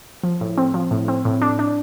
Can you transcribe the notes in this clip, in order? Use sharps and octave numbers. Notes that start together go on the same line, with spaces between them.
F3
A2
C4
F3
A2
C4
A2
D4
D4